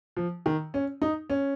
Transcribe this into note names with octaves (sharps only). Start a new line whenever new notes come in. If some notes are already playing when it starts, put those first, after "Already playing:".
F3
D#3
C#4
D#4
C#4